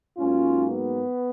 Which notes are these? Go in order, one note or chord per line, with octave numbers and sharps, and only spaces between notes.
G#2 F#3 A#3 C#4 F4
B3